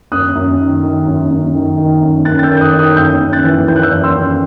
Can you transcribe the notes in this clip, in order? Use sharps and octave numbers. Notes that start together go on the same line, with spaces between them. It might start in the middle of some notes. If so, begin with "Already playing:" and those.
F#2 D#6 F#6
F#2
D#3
D#3
F#2
F#2
D#3
D#3
F#2
F#2 F#6 A6
A6
E6 G6
D#3
G6
D#6 F#6
D#3
D#6 F#6
F#2 E6 G6
F#2
F#6 A6
E3
E3 G6
F#6
E6 G6
F#2
C6 E6
F#2